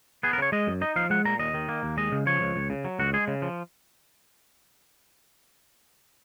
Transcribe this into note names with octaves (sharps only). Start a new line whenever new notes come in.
B3 G#4
A#4
C#3 C#5
G#3 D#5
F#2
D#4 D#5
F3 F5
G#3 F#5
A#2 A#5
D#2 D#5
D#3
A#3
D#2
G#3 D#5
C#3
F3 C#5
C#2
C#2
C#3
F#3
C#2 F#4
G#3 G#4
C#3
F3